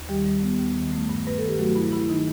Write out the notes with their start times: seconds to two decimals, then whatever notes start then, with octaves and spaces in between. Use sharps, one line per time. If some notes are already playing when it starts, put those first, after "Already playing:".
Already playing: D#2
0.09 D#3 G3 G4
0.26 G3
0.43 B3
0.59 D#2
0.76 D#3
0.93 A3
1.09 G2
1.26 G2 B4
1.38 D#3 A4
1.48 G4
1.59 F#3 A3 F#4
1.76 G2 E4
1.92 G2 E4
2.09 D#3 D#4